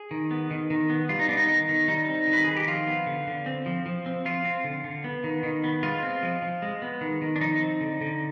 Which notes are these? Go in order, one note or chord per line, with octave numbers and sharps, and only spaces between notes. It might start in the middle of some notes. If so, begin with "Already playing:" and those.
Already playing: G#4
D#3
B3
D#3
D#3
B3
G3 F4
D#4
B3 D4
D#4
D#3
D#3
G3 D#4
C4
D#3
B4
D#3 G#4
G4
F3 F4
B3
D3
D3
C4
F3
F3
C4
F3 F4
C4
D3
D3
B3
D#3
D#3
B3
G#3 F4
C4
F3
F3
G#3
B3
D#3
D#3
D4
F3 D#4
C4
D3
D3